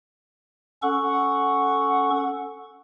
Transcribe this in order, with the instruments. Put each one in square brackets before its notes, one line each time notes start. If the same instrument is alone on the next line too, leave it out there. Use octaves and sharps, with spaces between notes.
[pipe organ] C#4 A4 C#6 [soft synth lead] F#5